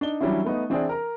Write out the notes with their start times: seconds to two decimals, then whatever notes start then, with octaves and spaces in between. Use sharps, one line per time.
0.01 D4 D#4 G7
0.20 E3 F#3 G3 C#4 D4 E4
0.45 A3 B3 D#4
0.70 E3 C4 D4 E4 G#4 D5
0.89 A#4 A#5